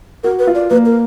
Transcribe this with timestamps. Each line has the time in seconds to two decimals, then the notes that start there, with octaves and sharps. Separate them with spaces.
0.23 F#4 A#4
0.39 B4
0.47 F4
0.55 D5
0.70 A#3 B4
0.86 A#4